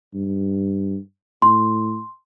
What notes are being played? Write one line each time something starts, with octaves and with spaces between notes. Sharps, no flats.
G2
A2 C6